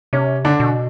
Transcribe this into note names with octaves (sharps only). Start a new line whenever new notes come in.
C3 C#4
D3 D4
B2